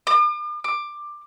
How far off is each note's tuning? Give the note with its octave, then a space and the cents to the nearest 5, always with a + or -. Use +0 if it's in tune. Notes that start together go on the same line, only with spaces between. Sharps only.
D6 +45
D6 +15